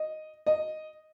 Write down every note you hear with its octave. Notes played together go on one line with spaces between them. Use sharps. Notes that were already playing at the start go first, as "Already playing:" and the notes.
Already playing: D#5
D#5